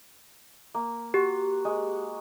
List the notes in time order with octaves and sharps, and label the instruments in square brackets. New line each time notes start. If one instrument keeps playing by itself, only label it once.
[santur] A#3
[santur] F#4 [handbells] G4
[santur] G#3